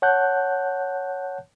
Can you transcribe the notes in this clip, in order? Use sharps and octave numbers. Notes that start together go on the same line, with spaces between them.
C#5 F#5 A5 F#6 G6